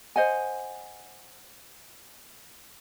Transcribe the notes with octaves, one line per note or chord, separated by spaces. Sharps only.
C5 D#5 F#5 G#5